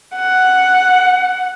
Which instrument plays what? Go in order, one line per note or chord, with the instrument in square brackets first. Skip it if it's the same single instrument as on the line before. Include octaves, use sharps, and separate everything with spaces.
[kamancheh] F#5